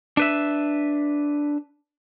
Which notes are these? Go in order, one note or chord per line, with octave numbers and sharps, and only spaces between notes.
D4 B4 E5